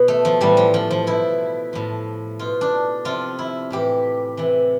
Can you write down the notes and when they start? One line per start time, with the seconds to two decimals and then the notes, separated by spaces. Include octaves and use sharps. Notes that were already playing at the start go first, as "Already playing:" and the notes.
Already playing: B2
0.08 A3
0.25 F3
0.41 A2 E3 G3
0.57 F3
0.74 F3
0.91 F3
1.07 B2 E4
1.73 A2 F3
2.39 B2 F4
2.61 D4
3.05 C3 F3 F4
3.39 E4
3.71 A2 E3 G4
4.37 C3 E3